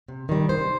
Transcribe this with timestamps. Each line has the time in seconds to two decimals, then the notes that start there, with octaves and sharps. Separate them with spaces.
0.08 C3
0.29 D#3 G3
0.49 C3 C5